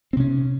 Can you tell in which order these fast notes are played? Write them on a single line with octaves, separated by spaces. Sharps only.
C4 C3 C#4